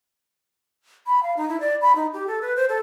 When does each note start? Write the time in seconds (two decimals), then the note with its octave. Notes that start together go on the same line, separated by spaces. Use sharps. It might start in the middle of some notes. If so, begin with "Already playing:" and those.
1.07 B5
1.23 F5
1.37 D#4
1.49 E4
1.60 D5
1.81 B5
1.96 D#4
2.13 G4
2.27 A4
2.41 B4
2.56 C5
2.69 A4